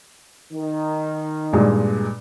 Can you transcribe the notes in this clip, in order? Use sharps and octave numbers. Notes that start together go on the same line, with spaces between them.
D#3
G2 A#2 G#3